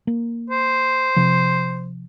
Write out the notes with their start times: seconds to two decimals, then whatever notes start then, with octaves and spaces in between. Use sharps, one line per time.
0.07 A#3
0.50 C5
1.16 C3 F3